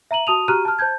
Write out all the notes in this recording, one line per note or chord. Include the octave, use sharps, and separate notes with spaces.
E5 A#5 D#7 F#7
F#4 A5 D#6 D#7 F7
F#4 G4 A#5 F6 F#6 D#7
A5 F6
C5 A5 G6 G#6